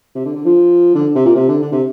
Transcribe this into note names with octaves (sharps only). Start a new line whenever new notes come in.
C3
D3
D3
F3
D3
C3
A#2
C3
D3
D3
C3